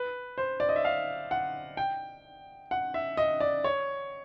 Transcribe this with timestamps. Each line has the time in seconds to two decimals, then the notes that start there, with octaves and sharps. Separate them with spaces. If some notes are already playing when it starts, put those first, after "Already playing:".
Already playing: B4
0.38 C5
0.60 D5
0.69 D#5
0.76 E5
0.85 F5
1.31 F#5
1.77 G5
2.71 F#5
2.94 E5
3.17 D#5
3.40 D5
3.64 C#5